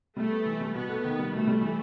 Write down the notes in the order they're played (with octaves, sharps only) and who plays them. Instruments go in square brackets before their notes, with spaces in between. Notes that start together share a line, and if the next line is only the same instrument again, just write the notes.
[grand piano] G3 [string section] A3
[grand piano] B3
E3
G3
[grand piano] B2 [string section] B3
[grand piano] A3
D#3
G3
[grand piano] B2 [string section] A3
[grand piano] G3
E3